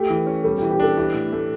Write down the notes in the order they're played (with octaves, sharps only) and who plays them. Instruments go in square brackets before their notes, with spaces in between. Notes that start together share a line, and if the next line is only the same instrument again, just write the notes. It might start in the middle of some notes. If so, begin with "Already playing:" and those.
Already playing: [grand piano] A3 [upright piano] G4
[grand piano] E3
C#4
[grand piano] G3 [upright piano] A4
[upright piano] G4
[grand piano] E3
[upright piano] G4
[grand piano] D4 [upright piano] A4
[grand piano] E3 [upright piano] G4
[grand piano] A2
A3